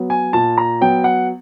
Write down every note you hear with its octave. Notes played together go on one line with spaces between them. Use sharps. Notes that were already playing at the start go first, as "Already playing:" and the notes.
Already playing: F#3 B3
G#5
A#2 A5
A#5
F#3 B3 G5
F#5